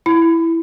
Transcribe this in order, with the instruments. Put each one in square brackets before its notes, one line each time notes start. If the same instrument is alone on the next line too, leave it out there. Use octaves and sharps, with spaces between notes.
[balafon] E4